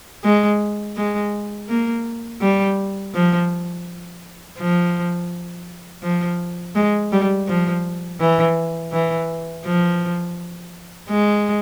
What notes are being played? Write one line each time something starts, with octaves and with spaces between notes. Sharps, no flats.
G#3
G#3
A#3
G3
F3
F3
F3
G#3
G3
F3
E3
E3
F3
G#3